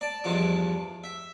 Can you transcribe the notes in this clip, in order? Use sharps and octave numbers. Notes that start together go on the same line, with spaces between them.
D5 A5
E2 G2 E3 F3 G#3 D6
E5